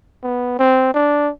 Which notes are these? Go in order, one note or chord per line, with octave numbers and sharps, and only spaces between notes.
B3
C4
D4